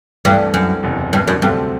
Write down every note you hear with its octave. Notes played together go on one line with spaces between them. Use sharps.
C2 G2 C3 E3 A3
F#2
F#1 E2 C3
G2
F#2
D2 G2 C3 F#3 A3 C4